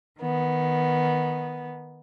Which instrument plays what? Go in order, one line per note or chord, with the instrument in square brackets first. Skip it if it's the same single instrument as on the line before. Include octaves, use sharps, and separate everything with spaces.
[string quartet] D#3 B3